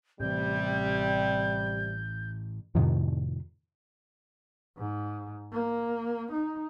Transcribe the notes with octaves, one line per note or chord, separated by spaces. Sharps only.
A2 C3 E3 G3 A3 G6
F2 A2 C3 D#3
G#2
A#3
D#4